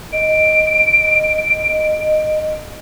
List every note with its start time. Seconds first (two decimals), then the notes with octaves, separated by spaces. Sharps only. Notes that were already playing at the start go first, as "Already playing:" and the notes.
0.12 D#5 D7